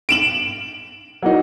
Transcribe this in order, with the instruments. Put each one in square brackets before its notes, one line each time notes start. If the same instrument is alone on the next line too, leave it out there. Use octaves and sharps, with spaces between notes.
[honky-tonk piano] D7 E7 F#7
[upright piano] F#3 A#3 D#4